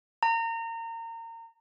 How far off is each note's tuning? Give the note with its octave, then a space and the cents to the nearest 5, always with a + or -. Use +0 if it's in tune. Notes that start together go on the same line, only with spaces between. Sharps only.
A#5 -30